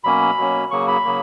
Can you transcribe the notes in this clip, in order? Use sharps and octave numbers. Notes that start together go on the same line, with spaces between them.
B2 F#3 A#3 C#4 B5
B2 F#3 A#3 C#4
C#3 F#3 A#3 C#6
B5
C#3 F#3 A#3